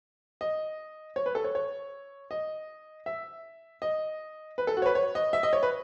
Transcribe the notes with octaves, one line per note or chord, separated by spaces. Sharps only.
D#5
C#5
B4
A4
C#5
C#5
D#5
E5
D#5
B4
A4
F#4
C#5
B4
C#5
D#5
E5
D#5
C#5
B4